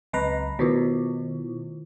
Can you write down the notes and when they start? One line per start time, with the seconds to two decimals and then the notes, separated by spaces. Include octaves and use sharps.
0.13 C#2 F#3 B4 D#5 A#5
0.59 B2 D#3 E4 F4